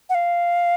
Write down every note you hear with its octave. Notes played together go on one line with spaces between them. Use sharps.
F#5
F5